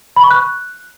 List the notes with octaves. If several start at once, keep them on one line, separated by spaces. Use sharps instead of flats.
B5
C#6
F#6